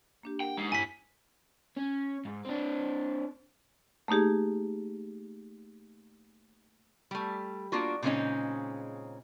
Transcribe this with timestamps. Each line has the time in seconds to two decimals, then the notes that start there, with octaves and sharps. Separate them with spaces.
0.23 A#3 D4 G4
0.40 A#4 F#5 G5
0.57 G#3 D#4
0.72 G2 A#2 E4 G#5 B6
1.77 C#4
2.25 G#2
2.45 C4 D4
4.08 A3 A#3 D#4 G4 G#4
7.11 G3 A3
7.72 A#3 D4 F4 F#4
8.02 A#2 C#3 G#3 C4 C#4 D#4